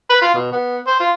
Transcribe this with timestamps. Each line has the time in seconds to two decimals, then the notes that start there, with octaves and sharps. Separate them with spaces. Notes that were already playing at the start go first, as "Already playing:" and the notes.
0.10 B4
0.22 F4
0.35 B2
0.52 B3
0.87 C5
1.00 F4